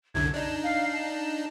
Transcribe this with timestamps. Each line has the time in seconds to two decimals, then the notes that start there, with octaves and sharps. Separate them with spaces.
0.14 C2 F#2 D3 G#6
0.34 D4 D#4 A5
0.63 F5
0.93 A5